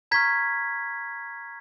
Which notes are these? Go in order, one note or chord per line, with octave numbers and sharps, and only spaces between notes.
A#5 C#6 F6 G#6 B6